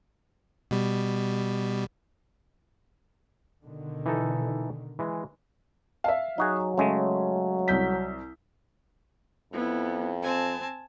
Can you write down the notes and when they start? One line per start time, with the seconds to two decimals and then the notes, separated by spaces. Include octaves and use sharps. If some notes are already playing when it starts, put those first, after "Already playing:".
0.71 B2 G3
3.64 B2 D3 D#3
4.06 E3 D#4 A4
4.99 E3 G#3
6.04 E5 F5 A5
6.38 F#3 D#4 F#4 G#4
6.78 C#3 G#3 A3 C#4
7.68 C2 G6 B6
9.53 F2 B3 E4
10.23 C4 G#5 A5